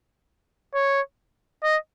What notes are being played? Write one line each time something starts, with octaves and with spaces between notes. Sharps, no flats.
C#5
D#5